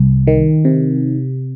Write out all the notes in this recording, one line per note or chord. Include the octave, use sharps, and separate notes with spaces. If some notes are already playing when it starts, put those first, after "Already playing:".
Already playing: C2
D#3
C3